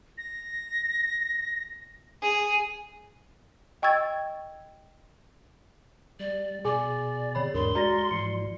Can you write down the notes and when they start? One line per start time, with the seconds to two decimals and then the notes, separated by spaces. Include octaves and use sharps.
0.18 A#6
2.22 G#4
3.82 D#5 G5 C#6 E6 G#6 A6
6.20 G3 D5
6.65 B2 G#4 D5 G#5 D6
7.35 D3 C#5 B5
7.54 E2 G#2 D4 A#4 C6
7.75 G#3 F#4 D5 A#5 A6 A#6
8.11 G#2 E3 F3 C7 C#7